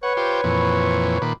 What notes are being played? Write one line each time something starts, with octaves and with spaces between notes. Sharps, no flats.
B4 C#5 F#5 C#6
F4 G4 C5
F2 A#2 E3
A#2 D#3 B4 B5 D6